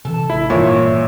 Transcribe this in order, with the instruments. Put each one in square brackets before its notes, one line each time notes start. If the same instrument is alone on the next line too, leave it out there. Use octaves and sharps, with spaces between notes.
[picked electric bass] C3 E3 [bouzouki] A4
[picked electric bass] G#1 [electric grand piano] E4
[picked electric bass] G#1 G2 E3 [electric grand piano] A#2 [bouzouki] E4 C#5